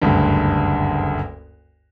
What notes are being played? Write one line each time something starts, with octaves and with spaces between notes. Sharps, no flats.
F#1 D2 G2